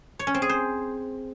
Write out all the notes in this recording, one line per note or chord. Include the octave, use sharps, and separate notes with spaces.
C#5
C#4
C4
G#4
C5